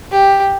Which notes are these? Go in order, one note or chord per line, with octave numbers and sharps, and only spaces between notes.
G4